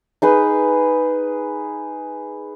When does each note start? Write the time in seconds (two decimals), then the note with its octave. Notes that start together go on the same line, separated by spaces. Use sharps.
0.22 D#4 G#4 B4